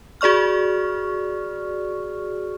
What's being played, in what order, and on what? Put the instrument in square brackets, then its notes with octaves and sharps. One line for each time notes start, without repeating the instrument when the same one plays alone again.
[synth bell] F#4 G#4 D5 C#6 F6